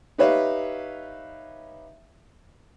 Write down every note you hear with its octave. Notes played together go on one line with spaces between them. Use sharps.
D#4 G4 B4 C#5 E5 F5